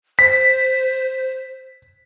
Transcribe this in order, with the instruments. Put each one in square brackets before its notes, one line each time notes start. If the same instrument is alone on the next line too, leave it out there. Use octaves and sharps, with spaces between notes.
[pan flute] C5 [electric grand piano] B6